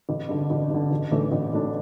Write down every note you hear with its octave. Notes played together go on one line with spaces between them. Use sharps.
A1
G2 D3
A1
G2 D3
A1
A2 E3 A3 D4
A1
A2 E3 A3 D4